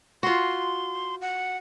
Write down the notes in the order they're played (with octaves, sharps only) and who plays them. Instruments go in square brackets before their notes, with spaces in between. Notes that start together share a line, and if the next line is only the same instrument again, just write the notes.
[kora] F4 F#4 [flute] C6
[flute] F#5